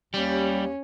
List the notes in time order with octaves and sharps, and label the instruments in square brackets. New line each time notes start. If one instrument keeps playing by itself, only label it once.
[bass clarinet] D#2 [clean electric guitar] G3 [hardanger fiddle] C#4